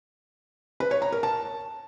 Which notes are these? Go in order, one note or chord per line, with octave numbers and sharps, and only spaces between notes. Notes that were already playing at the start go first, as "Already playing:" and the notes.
B4
C#5
A#5
A#4
A5